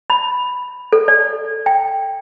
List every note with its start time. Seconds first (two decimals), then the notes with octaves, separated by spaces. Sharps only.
0.10 B5
0.92 A4
1.08 D5
1.66 G5